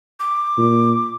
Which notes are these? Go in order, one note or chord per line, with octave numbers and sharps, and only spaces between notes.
D6
A#2